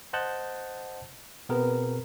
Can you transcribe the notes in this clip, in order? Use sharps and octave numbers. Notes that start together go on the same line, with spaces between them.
C5 D#5 F#5 A5 F#6 G6
B2 B3 C4 G#4 A#4 B4